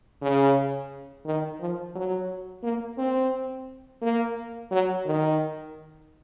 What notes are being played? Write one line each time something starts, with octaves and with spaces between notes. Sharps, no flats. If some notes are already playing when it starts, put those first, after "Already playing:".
C#3
D#3
F3
F#3
A#3
C4
A#3
F#3
D#3